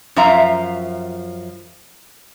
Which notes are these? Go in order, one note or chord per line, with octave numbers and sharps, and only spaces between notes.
F#2 F3 E5 F5 A#5